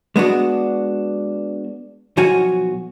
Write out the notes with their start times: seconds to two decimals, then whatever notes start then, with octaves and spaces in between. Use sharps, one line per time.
0.16 G#3 B3 D4 F#4
2.17 B1 F3 F#4 C#5 G#5